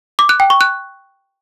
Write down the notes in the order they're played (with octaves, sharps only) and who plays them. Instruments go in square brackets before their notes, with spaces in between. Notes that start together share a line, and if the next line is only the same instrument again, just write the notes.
[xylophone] D6
F#6
G5
C#6
F#6